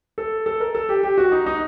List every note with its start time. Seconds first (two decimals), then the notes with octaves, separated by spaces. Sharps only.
0.18 A4
0.46 A4
0.60 A#4
0.75 A4
0.89 G4
1.03 G4
1.18 F#4
1.32 D#4
1.46 D#4